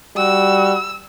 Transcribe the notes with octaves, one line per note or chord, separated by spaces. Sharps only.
G3 F#4 E6